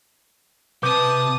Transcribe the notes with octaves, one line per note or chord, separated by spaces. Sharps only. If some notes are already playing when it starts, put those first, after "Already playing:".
C3 B4 A5 D6 D#6 G6